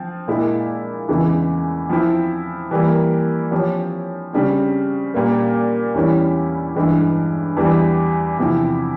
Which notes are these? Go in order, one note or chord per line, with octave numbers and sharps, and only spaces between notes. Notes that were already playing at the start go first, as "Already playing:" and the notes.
Already playing: F3 C4
A#2 G#3 E4
E2 C#3 E3 G#3
F3 C4 E4
E3 G3 A#3
F3 C4 G4 C#5
C#3 G3 C4
A#2 G3 A#3
E2 E3 G3 C#4 E4
G2 E3 G#3
E2 E3 G3
E2 C3 F3 C4 E4